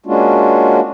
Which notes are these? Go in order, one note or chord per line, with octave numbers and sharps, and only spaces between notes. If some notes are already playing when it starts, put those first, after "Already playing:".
G#3 A#3 C#4 D4 F4 F#4